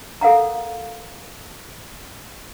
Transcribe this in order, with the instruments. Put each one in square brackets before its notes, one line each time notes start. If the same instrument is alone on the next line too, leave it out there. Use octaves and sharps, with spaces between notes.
[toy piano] A4 A#4 F5 F#5 A#5